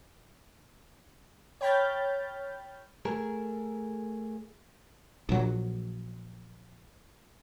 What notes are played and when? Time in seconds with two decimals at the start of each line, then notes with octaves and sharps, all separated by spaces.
1.61 C#5 G5 B5 F6 G6 A6
3.05 A3 G#4 A#4
5.29 A#1 F#3